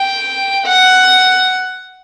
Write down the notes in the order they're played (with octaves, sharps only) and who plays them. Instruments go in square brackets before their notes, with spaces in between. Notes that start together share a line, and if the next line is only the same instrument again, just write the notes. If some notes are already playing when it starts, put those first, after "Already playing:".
Already playing: [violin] G5
F#5